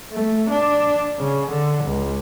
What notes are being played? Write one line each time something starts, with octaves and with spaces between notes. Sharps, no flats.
A3
D4
C#3
D3
C#2